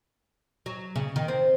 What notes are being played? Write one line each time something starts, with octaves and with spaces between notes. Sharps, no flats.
F#3
C#3
D#3
C4